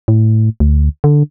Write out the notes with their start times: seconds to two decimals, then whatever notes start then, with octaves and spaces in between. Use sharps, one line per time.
0.08 A2
0.60 D2
1.04 D3